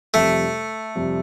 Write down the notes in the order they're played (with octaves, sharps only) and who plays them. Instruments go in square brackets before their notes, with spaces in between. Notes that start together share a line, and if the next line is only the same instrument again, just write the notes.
[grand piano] F2 C3 G3 [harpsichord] A3
[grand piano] F2 C3 G3